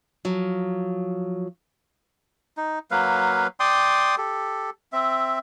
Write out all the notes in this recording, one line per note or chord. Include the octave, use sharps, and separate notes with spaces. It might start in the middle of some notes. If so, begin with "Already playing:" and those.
F3 F#3
D#4
F#3 A#3 B4 F5
D5 G5 C6 D#6
G4 A4
C4 E5